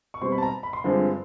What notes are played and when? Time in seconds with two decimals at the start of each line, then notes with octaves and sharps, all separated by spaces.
0.14 C#6
0.21 B2 G3 C4 C6
0.32 B5
0.38 A5
0.43 A#5
0.63 B5
0.73 C6
0.84 G2 D3 F3 G#3 C4